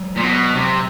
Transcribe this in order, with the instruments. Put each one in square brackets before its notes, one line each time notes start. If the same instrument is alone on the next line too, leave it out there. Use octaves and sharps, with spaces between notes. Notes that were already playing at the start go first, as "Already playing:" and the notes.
Already playing: [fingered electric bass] F#3 G#3
[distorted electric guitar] A#2
B2
C3